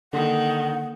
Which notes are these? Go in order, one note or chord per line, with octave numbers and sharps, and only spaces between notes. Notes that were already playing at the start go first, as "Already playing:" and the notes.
D3 D#3 A#3 A4 F#5